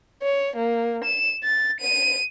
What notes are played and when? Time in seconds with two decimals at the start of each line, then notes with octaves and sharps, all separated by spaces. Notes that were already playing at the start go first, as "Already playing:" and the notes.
0.22 C#5
0.56 A#3
1.04 E7
1.44 A6
1.80 D#7